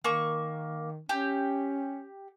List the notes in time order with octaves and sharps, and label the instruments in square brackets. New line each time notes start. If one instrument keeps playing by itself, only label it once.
[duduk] D#3 [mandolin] A#3 C#6
[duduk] C#4 [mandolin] G4